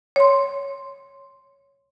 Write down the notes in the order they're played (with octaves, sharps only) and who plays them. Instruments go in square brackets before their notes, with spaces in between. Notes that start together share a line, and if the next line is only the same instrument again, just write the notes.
[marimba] C#5 C6